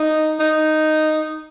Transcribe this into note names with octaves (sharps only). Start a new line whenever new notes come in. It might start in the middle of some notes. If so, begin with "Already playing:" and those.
Already playing: D#4
D#4